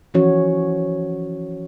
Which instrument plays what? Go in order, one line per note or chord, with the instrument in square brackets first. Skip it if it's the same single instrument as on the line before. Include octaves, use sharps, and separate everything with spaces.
[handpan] E3 F3 C#4 F#4 C#5